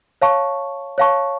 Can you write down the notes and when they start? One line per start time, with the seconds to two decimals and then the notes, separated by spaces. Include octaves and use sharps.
0.22 C#5 F5 A5 C#6
0.98 C#5 F5 A5 C#6